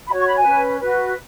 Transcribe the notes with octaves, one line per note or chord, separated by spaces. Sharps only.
F#4 C#5 B5
C#6
B5
G#5
C#4 B4
F#4 B4